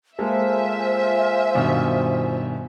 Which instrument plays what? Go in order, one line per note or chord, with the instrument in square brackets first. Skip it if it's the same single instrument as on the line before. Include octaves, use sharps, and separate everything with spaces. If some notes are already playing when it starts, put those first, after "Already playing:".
[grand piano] G#3 A#3 A4 [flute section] F4 C5 G#5 [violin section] E5
[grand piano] G2 B2 D#3